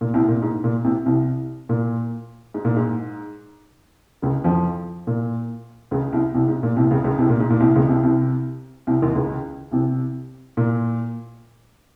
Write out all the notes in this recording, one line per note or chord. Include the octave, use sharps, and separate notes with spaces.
A#2
C2 C3
A#2
G#2
A#2
C2 C3
C2 C3
A#2
G#2
A#2
G#2
C#2 C#3
F2 F3
A#2
C#2 C#3
C2 C3
C2 C3
G#2
A#2
C2 C3
C#2 C#3
C#2 C#3
C2 C3
A#2
G#2
A#2
C2 C3
C#2 C#3
C2 C3
C2 C3
C2 C3
D#2 D#3
C#2 C#3
C2 C3
A#2